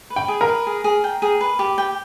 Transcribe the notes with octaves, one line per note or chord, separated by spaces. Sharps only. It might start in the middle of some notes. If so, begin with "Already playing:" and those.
B4
G5
G#4
A#4
B4
G#4
G#4
G5
G#4
B4
G4
G5